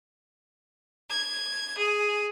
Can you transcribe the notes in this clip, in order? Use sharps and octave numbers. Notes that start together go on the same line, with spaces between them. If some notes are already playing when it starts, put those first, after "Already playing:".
G#6
G#4